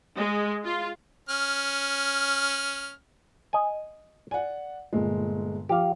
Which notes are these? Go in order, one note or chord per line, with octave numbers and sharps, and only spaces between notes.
G#3
F4
C#4 F6
D#5 G#5
D5 F#5 G#5
G1 A#2 G#3
F3 G4 F5